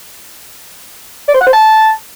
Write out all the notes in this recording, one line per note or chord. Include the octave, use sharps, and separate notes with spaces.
D5
C5
F#5
C5
A5